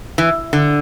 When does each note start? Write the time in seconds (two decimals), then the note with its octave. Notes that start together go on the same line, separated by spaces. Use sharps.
0.18 E3
0.53 D3